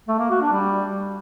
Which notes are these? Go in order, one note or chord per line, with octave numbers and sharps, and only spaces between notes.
A3
A#3
F#4
D4
G3